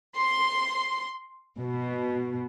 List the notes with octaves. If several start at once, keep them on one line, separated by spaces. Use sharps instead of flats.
C6
B2